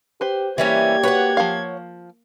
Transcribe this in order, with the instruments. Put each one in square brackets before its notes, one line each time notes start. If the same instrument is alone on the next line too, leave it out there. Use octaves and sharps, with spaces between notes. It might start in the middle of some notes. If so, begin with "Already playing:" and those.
[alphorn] G4 [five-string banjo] B4 C5
[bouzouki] E3 G3 C#4 [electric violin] A#3 G#6 [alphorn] G4
[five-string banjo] F#4 B4 [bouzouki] C#5 F#5
[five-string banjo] F3 F5